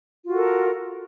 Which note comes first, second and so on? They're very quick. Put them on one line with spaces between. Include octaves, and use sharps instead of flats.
F4 F#4 A4 A#4